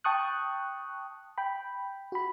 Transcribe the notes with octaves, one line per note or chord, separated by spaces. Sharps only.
G5 A5 C#6 D#6 F#6
G5 B5
F#4 B5